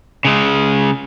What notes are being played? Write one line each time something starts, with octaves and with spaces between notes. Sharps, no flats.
C#3 G#3